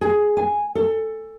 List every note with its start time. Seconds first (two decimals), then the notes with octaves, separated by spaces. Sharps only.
0.01 G#4
0.37 G#5
0.75 A4